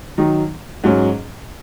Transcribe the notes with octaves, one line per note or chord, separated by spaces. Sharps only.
D#3 F#3 D#4
G#2 F#3 C#4